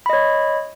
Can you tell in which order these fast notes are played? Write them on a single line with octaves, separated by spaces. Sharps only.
B5 D#5 C#5